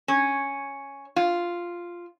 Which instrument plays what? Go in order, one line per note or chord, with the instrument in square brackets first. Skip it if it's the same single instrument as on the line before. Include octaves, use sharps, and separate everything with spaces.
[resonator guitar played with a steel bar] C#4
F4